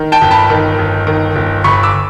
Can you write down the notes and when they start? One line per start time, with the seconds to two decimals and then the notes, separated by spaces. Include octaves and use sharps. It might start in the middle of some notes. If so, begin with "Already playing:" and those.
Already playing: D#3
0.12 G5 A5
0.22 G1
0.31 A5 B5
0.50 D#3
0.79 G1
1.07 D#3
1.36 G1
1.64 G1 B5 C#6
1.83 D6 E6